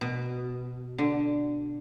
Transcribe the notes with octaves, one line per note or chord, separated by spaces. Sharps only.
B2
D3